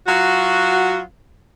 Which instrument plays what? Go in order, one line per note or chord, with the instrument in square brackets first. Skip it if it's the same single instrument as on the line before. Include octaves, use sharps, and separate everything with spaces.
[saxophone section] F#3 F4 F#4